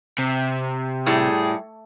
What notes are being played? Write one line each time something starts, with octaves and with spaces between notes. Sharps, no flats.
C3
A2 G3 G#4